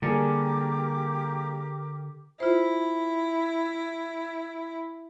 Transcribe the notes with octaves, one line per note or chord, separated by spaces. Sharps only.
D3 G3 A#3 G4 G#4 A#4 D6
E4 F4 C5